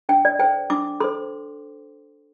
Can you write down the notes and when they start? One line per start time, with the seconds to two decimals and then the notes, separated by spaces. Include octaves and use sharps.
0.09 D4 G5
0.25 D5
0.39 A4 C5 G5
0.70 D4 D6
1.00 A4 C5 C6